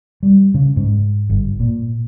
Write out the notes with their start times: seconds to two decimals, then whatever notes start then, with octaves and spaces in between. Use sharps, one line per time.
0.23 G3
0.54 C#3
0.76 G#2
1.30 G1
1.60 A#2